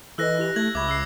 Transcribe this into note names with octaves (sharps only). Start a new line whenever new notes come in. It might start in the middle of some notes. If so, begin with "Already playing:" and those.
E3 A4 B4 D#5 E6 F#6 A#6
E4 G4 F7
A3 G#6 F#7
C#2 E5 B5 C#6 D6 G#6
E6 C7